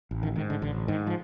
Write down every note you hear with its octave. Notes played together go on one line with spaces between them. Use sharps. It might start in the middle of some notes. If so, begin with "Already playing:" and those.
A1
D#3
G#2 D#3
D3
A1 D3
G#2 D#3
F3